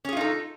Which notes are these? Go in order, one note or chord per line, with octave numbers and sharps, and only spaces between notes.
C#4 D#4 F4 G#4 A4